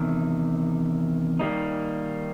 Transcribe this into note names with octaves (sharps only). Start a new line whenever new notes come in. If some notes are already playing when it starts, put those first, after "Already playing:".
Already playing: E2 C3 D#3
D#3 G3 A#3 D#4